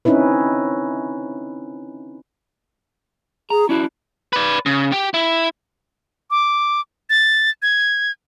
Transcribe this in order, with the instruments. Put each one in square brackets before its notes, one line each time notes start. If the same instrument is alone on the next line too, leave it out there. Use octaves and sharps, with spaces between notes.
[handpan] C4 C#4 D#4 E4 B4
[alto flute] G#4 [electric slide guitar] A#5
[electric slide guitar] C#4 D4 F#4 [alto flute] E4
[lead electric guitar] B4 D5
C#3
G4
E4
[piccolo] D6
A6
G#6